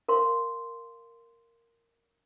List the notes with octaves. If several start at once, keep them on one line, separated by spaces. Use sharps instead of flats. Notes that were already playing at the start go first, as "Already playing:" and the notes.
A#4 F5 C6